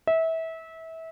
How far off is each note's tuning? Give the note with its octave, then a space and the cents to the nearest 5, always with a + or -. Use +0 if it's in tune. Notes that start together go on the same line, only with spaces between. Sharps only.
E5 -25